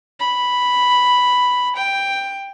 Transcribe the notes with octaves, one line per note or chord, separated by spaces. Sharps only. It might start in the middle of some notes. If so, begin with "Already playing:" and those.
B5
G5